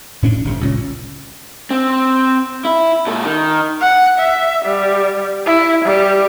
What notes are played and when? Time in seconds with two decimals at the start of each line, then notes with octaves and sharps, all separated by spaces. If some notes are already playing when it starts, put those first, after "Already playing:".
0.22 A2 C#4 D4
0.45 G1 C3
0.61 C#2 A#2 C#4
1.71 C4
2.65 E4
3.07 A#2 A4
3.24 D#3
3.82 F#5
4.19 E5
4.66 G3
5.46 E4
5.86 G3